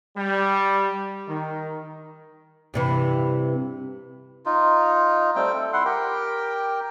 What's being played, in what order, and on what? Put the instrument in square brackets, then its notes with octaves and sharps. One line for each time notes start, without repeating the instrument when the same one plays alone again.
[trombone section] G3
D#3
[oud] G2 C3 E3
[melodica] D#4 F4
G3 A3 C4 G5
A4
E4 F#5 C6
G4 A#4 G5